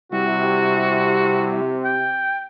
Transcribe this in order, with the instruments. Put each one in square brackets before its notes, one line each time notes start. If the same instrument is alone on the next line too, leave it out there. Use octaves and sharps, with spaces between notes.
[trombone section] C3 [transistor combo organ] G3 E4 [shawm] F#4
[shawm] G5